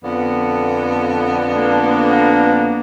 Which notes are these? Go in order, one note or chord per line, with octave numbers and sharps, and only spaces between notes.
F2 D3 B3
A#3 D4